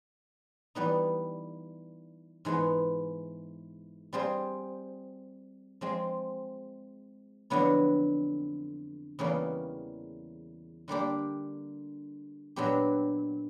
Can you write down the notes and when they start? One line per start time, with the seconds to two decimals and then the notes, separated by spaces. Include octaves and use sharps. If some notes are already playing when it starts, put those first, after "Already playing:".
0.75 E3 G3 B3 D#4
2.45 G#2 E3 G#3 B3
4.13 G3 C4 F4 G#4 C5
5.81 F3 G#3 C4
7.50 F2 D3 F#3 B3 E4
9.19 E2 C#3 E3 G3 A#3
10.88 D3 G3 A#3 D4 G4
12.56 A#2 F#3 B3 D4 G4